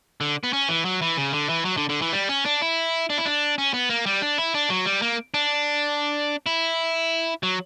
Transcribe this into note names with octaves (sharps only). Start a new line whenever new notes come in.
D3
B3
C#4
E3
F#3
E3
C#3
D3
E3
F#3
D3
D3
E3
G3
C#4
D4
E4
D4
E4
D4
C#4
B3
A#3
G3
D4
E4
D4
F#3
G3
A#3
D4
E4
F#3